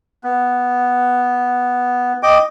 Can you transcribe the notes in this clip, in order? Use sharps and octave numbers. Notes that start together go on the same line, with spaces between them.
B3
D#5 G5 D6